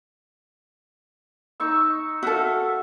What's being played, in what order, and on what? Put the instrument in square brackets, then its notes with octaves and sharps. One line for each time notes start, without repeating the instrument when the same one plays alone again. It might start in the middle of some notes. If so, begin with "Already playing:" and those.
[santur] D#4 C#6 E6
[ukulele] F#4 A4 [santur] E5 F5